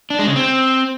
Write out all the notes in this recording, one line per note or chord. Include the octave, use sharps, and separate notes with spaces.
D4
G#3
C#3
C4